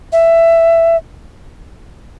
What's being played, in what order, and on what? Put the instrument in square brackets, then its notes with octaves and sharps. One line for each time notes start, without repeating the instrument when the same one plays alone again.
[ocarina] E5